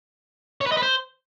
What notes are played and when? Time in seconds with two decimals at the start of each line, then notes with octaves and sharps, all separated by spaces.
0.61 C#5
0.66 B4
0.72 D#5
0.77 B4
0.83 C5